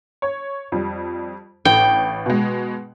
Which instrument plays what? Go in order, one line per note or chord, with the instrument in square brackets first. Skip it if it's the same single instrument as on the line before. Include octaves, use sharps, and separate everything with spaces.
[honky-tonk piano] C#5
F2 G3
[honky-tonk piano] A1 [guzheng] G5
[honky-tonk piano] B2 G#3